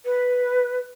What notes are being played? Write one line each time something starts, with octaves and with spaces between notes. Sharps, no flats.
B4